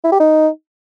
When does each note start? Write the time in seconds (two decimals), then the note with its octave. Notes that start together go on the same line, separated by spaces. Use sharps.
0.04 E4
0.12 G4
0.20 D#4